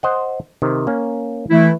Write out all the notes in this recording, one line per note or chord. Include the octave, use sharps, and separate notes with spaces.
C5 D#5 F#5
C3 D#3
A#3 C#4
E3 A3 E4